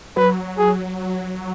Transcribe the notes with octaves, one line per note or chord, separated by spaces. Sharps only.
F#3 B4
G#4